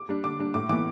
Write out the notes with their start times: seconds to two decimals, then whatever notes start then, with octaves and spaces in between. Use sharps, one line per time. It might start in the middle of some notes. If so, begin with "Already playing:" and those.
Already playing: D6
0.09 G3 D4
0.24 D3 D6
0.39 G3 D4
0.54 A2 D6
0.69 E3 B3 D6